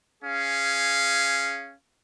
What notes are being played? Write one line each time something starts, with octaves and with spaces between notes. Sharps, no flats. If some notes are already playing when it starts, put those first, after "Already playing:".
C#4 G#4 F5